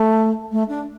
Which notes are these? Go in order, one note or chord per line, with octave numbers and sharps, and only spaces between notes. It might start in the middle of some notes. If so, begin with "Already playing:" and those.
Already playing: A3
A3
D4